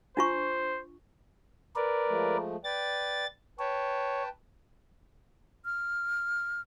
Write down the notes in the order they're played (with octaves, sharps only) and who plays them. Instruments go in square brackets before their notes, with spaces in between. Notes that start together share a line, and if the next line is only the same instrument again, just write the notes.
[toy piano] D4 F4 C#6 [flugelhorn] C5
[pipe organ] A#4 B4 D5
[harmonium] F3 G#3 A3
[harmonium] B4 D5 G5 [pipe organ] A6
[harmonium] B4 G5 A5 [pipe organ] C#5
[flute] F6